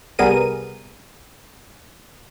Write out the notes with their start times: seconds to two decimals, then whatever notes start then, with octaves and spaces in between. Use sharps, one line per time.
0.19 C2 G3 B3 G#4 A#4 D#7